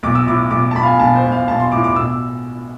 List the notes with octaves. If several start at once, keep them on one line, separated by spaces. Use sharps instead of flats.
B1 D6
E6
A2 D6
B1 D6
A5
B1 B5
F5
G#5
B1 A5
C5
B1
F5
B1 A5
C6
A2 D6
D6
B2 E6